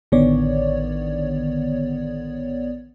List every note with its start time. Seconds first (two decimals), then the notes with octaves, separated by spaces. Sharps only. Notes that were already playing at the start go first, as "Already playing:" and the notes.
0.12 A1 D3 D#3 B3 C#5 D5